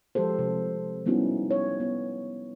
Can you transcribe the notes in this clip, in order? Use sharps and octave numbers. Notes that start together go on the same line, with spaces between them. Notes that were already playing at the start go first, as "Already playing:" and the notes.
F3 G#3 G4 A4 C5
C3
G3 B3 C#4 D#4 E4 F#4
C#5
B3